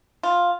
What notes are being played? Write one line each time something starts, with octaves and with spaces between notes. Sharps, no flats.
F4